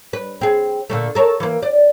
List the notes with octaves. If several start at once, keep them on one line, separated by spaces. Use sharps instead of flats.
B4
C4 G#4
A#2 D3 A3
A4 A#4 C#5
E3 A#3
D5